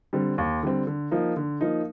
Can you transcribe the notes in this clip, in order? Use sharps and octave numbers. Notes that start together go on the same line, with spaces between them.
D3 G3 C4
D#2
D3 G3 C4
D3
F3 A#3 D#4
D3
F3 A#3 D#4